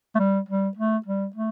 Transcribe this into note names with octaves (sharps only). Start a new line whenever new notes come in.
A3
G3
G3
A3
G3
A3